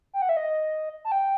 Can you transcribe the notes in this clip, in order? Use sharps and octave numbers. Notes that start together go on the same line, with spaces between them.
G5
F#5
E5
D#5
A5
G5